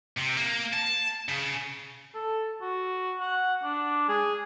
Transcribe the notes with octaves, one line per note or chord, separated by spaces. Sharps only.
C3
A#3
A5
C#3
A4
F#4
F#5
D4
G#4